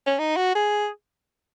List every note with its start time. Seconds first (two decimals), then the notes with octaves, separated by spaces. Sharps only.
0.06 C#4
0.19 D#4
0.36 F#4
0.55 G#4